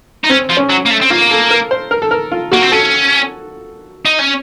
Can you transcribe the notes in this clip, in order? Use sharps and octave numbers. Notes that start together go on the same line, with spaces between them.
D#4
C4 C#4
F3
C#4
F#3
A#3
A3
C4
A#3 F4
A4
A#4
C5
A#4
A4
A#4
F4
A#3 F#4
C4
C#4 A4
D#4
C#4